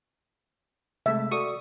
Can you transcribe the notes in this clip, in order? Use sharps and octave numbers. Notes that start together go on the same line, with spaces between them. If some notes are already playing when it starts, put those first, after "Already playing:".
C3 G#3 A3 E5
F#4 A4 D5 C#6 D#6